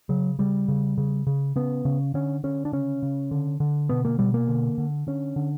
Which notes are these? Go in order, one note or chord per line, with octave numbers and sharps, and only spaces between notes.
C#3 F#3
C#3 G3
C#3
C#3
C#3
C#3 B3
C#3
D3 C#4
D3 C#4
D4
C#3 C#4
C#3
D3
D3
B2 B3
A#3
B2 G3
A#3
D3
D3
D3 C#4
D3